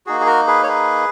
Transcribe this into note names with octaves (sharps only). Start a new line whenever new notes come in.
A#3 D#4 F#4 G#4
G#4
F#4 A#4
G#4 B4
C#5
G#4 B4